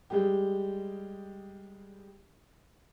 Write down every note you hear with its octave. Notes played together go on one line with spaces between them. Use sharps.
G3 G#3 G4